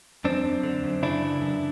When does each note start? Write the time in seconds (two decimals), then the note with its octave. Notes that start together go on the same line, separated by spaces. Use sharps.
0.24 F#2 C4 D4
0.45 F#2
0.63 D3
0.83 F#2
1.02 C#3 D4 E4
1.22 E3
1.41 F#2